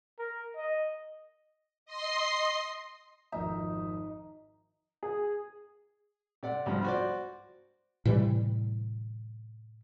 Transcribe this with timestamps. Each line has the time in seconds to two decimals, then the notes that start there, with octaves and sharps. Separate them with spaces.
0.19 A#4
0.56 D#5
1.86 D#5 C6 C7
3.32 G#1 F2 D#4 E5
5.03 G#4
6.43 C3 D5 F#5
6.66 C2 G2 F3
6.84 F#4 C5 D5
8.05 A2 C3 E3 G3